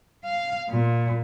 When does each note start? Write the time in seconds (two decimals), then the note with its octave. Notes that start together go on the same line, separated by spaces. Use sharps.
0.25 F5
0.69 A#2